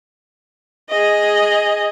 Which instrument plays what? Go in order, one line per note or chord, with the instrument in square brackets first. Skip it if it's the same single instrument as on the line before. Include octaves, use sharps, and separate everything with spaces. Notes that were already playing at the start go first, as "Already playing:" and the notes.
[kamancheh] G#4 D#5